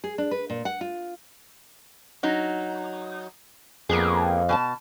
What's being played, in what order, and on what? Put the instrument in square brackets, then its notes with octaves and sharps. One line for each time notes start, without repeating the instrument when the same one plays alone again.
[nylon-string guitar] G#4
D4
B4
A#2
F#5
F4
[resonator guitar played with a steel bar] F#3 D#4
[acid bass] F2 [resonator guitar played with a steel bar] A#3 B3 G#4
[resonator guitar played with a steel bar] B2 G#5 A5